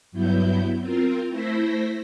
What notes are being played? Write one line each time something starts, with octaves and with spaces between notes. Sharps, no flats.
G2 F#3 B3 E4 G6
C4 F4 A#4
A3 E4 C5 A#6 B6